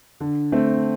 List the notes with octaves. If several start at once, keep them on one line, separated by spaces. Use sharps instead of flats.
D3
A3 C4